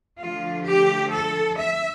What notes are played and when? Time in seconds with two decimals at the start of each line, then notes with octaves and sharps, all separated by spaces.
0.18 D3 F3 A3 F4
0.65 G4
1.11 A4
1.57 E5